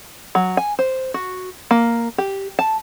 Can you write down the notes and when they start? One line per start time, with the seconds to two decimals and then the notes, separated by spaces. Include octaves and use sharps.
0.35 F#3
0.57 G#5
0.79 C5
1.14 F#4
1.71 A#3
2.18 G4
2.59 A5